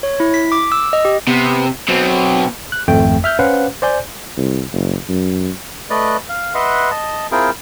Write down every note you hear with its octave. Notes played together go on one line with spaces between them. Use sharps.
C#5
E4
B6
D6
E6
D#5
G4
C3 B3
B2 F#3 C4
F#6
G#1 F2 A3 G5
E5 F6 G6
C#4 B4 C5 F5 F#5
C5 D5 G#5 G6
C2
F#1
F#2
A3 B4 D5 D#5 F#6
F5
B4 D#5 E5 F#5 C6
D#5 A5
C4 E4 F4 G#4 A#4 G5